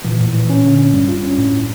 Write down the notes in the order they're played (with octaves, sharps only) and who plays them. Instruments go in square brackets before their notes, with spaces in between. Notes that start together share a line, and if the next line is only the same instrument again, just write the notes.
[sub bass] A#2 [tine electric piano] E3
[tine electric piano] A2
E3
C#4
D3
C#4
[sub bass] G2 [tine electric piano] G3
[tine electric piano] F4
C#4
A2
A2